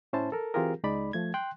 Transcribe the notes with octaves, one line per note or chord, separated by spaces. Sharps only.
A2 C#4 E4 C5 A5
A4 A#4
E3 C4 F4 G4 G#4 A#4
C#2 G#3 D#4 D5 B5
F3 A3 G#6
G5 C6 F#6